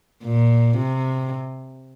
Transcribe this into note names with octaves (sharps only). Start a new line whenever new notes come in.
A#2
C3